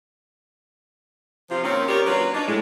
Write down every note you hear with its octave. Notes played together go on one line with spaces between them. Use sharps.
C3 F3 F4
D#3 A#3 C4 C#4
D#3 F4 G4 A#4 C#5 D5
F#3 A#3 C#4 D4 F4 B4
D4 D#4
A2 G#3